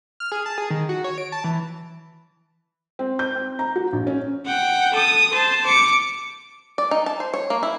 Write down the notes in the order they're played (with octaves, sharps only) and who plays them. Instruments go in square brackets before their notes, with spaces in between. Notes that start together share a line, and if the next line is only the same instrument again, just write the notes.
[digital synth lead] F6
G#4
A5
G#4
D#3
F#4
C#5
D7
A5
E3
[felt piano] C4
G6
C4
A#5
F#4
A#1
C#4
[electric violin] F#5 G5
A4 D#6
C5 A5
D6 C#7
[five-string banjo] D5
D#4
A5
C5
C#5
A#3
E4